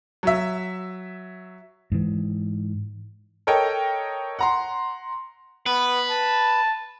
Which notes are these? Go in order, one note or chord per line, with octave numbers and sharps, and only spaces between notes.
F#3 E5
G#2 E3
A4 A#4 C#5 D#5 G5
F#5 A#5 C6
B3 B4
A5